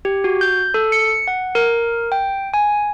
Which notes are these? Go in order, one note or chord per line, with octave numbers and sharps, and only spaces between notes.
G4
F#4
G6
A4
C#7
F#5
A#4
G5
G#5